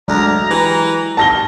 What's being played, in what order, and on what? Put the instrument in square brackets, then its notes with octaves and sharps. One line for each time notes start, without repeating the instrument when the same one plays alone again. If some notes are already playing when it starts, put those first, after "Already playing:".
[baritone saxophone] D2 [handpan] F#3 G#3 D5 [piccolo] A#5
[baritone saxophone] E3 [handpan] G4
[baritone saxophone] D#2 [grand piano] A5 A#6 G7